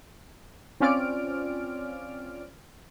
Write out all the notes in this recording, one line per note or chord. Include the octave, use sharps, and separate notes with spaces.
C4 C#4 F4 D5 F6 D7